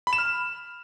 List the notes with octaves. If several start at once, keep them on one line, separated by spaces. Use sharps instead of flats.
B5
E7
F6